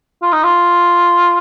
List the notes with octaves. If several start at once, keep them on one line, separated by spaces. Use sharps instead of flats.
F4
D#4
F4